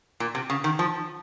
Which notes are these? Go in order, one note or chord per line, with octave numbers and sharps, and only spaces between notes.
A#2
C3
C#3
D#3
F3